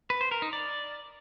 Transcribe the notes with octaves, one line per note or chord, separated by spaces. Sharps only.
B4
C5
A#4
D#4
D5